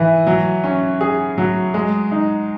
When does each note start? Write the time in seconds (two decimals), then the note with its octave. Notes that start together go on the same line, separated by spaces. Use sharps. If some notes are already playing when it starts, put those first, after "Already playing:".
Already playing: E3 E4
0.27 F#3
0.64 C#4
1.01 G#4
1.38 F#3
1.74 G#3
2.11 D#4